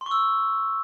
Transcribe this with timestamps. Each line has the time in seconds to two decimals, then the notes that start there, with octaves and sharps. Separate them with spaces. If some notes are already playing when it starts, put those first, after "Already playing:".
0.01 C6
0.06 C#6
0.11 E6